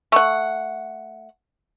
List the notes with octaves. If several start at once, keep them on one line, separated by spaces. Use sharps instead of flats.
A3 F#5